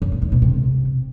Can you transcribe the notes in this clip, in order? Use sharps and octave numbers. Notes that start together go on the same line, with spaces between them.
F#2
A#2
D#3
B2
C3